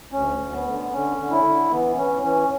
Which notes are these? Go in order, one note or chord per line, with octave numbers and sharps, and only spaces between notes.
D2 C#4
D2
B3
D3
D3 C#4
D3
E4
D3
E3 B3
E3 C#4
E3 C#4